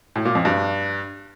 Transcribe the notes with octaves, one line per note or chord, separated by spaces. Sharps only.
A2
A#2
F2
G2